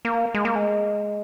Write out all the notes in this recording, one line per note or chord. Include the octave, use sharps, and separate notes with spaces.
A#3
G#3
A#3
G#3